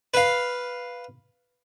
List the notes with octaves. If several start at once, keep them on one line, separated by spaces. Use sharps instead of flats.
B4 F5